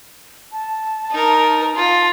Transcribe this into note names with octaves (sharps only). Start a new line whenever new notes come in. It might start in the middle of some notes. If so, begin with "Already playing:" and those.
A5
D#4 A#4
F4